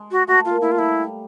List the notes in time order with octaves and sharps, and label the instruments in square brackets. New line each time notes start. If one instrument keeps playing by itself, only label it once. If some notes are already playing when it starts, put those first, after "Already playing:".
Already playing: [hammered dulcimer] G#3
[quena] F#4
[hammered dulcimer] A3 [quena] F#4
[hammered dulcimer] A#3 [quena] F4
[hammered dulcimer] A3 [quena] E4
[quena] F4
[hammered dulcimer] G3 [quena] E4